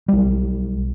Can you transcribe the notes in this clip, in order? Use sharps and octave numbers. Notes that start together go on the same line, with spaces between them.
B1 G3